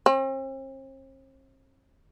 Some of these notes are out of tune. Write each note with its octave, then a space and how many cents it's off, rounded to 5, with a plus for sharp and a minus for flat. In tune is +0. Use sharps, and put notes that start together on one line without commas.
C4 +45